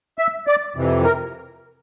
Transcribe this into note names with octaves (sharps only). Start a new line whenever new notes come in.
E5
D5
F2 C3 E3
A#4